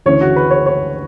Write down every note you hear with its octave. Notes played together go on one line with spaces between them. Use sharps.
D2 C#3 E3 C#5
F#4
B4
C#5
C#5